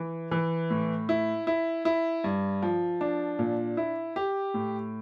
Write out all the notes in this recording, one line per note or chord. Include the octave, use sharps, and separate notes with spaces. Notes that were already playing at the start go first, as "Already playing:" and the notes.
Already playing: E3
E3
A2
E4
E4
E4
G2
F3
D4
A#2
E4
G4
A2